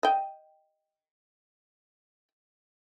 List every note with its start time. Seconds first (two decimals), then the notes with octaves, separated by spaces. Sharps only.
0.03 D#5 G5